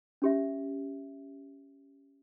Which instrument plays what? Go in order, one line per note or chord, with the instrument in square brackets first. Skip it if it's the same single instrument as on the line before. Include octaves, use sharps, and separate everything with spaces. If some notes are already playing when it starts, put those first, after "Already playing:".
[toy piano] C#4 G4 E5